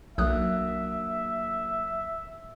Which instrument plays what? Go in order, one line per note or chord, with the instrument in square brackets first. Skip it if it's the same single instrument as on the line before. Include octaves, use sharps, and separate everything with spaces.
[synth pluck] B1 D#6 F#6 [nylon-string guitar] F#3 A#3 D4 [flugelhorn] E5